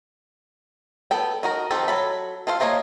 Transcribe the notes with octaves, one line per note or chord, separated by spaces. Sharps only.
B3 A4 G5
D#4 F#4 A#4
D#3 F3 C4 G4 A4
F#3 A4 B5
F4 A4 C5 F5
A3 A#3 C5 C#5 D#5